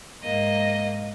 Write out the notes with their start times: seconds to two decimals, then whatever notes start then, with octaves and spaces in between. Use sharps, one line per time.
0.23 G#2 A#3 D#5